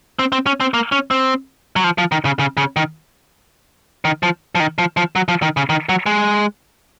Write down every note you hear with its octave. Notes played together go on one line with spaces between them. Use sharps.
C4
C4
C#4
C4
A#3
C#4
C4
F#3
F3
F3
D#3
C#3
C#3
C#3
D#3
D#3
F3
F3
D#3
F3
F3
F#3
F3
D#3
C#3
D#3
F#3
G#3